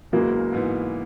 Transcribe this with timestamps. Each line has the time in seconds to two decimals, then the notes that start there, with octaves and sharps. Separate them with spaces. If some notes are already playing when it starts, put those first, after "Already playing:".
0.12 F#1 E2 C#3 E3 F#3 G#3 A#3
0.53 G#2 E3 B3